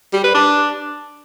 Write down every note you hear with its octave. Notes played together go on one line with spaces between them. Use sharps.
G3
B4
D4